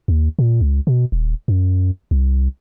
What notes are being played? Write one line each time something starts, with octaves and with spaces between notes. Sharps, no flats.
D#2
A#2
C#2
B2
D#1
F#2
C2